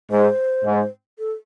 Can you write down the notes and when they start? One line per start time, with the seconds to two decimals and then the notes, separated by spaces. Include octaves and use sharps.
0.11 G#2 C5
0.64 G#2
1.19 A4